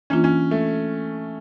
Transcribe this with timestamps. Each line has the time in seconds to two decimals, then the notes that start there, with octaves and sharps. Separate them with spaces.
0.10 E3 A#3 C#4 D4 F4
0.24 C#4
0.51 A3